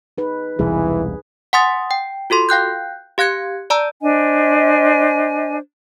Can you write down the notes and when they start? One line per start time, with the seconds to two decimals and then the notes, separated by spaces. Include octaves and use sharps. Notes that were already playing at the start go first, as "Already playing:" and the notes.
0.18 D#4 G#4 B4
0.59 E1 C2 E3 G#4
1.53 F#5 G#5 C6 D#6 A6
1.91 G5
2.30 F4 F#4 A4 C6
2.49 F5 G5 F#6 G6
3.18 G4 F5 F#6 G#6 C#7
3.70 D5 A5 A#5 E6
4.01 D4 C5 D#5 G#5